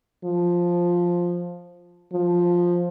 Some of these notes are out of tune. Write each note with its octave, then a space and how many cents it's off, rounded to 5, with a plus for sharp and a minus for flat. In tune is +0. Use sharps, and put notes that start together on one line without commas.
F3 +5
F3 +5